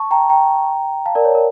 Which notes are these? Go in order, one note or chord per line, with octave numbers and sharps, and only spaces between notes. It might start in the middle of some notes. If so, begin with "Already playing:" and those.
Already playing: A5 C#6
G5 A#5
G5 A#5
F5 A5
A#4 D5
C#5
A#4